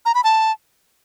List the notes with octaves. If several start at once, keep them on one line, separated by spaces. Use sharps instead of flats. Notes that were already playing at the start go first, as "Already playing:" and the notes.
A#5
B5
A5